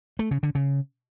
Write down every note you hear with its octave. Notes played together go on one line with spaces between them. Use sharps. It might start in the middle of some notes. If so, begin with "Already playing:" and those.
A3
C#3
D3
C#3